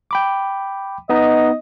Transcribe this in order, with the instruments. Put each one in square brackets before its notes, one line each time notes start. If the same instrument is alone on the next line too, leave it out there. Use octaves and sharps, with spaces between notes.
[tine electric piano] G5 B5 D6
[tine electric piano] B3 D#4 [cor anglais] D#5